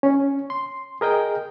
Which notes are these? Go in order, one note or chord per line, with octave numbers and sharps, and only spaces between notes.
C#4
C6
G#4 A#4 D#5 G5